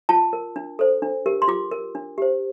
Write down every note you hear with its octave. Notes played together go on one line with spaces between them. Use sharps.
F4 A5
A#4
D4
A4 C5
D4
G4 A#4
C6
F4 D6
A#4
D4
G4 C5